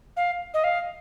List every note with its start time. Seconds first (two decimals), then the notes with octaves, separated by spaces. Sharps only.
0.17 F5
0.54 D#5
0.64 F5